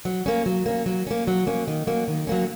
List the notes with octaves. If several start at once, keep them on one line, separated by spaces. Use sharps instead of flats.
F#3
A#3 C#4
F#3
A#3 C#4
F#3
A#3 C#4
F#3
A#3 C#4
D#3
F#3 A#3 C#4
D#3
F#3 A#3 C#4